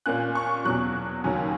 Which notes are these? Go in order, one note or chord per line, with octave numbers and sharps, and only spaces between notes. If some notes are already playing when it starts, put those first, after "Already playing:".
A#2 A#3 C#4 F#6
C#6
E2 B2 F#3 F#6
D#2 C#3 F#3 C#4